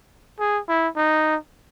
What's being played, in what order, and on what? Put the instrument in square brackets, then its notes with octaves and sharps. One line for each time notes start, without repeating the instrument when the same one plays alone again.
[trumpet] G#4
E4
D#4